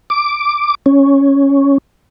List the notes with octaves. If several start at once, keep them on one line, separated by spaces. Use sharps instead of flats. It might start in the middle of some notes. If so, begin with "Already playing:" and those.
D6
C#4